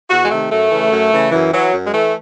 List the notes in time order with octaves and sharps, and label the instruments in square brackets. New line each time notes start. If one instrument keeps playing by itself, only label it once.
[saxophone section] E2 F#4
G#3
C3 D#3 A3
F#2 A3
C#3 E3
F#2
C#3 E3
F#2 E3
E3 F#3
F#2
G#3
E3 A3